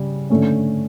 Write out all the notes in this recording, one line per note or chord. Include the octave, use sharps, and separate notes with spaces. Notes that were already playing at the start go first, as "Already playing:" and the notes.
Already playing: C#3 G3
D3 A3 C#4